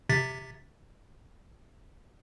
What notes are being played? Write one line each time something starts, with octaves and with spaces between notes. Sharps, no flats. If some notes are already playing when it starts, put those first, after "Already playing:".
C3 A6 B6